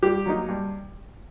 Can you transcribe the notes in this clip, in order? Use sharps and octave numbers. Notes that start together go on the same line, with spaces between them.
G2 G4
F#3 A#3 D#4
G2